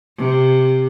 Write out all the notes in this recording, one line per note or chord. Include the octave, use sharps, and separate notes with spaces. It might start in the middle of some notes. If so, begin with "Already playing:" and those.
C3